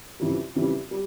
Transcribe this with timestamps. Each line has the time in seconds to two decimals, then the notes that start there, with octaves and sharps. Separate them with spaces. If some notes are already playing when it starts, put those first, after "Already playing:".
0.20 F2 C#3 E3 G3
0.55 F2 C#3 E3 G3
0.91 G3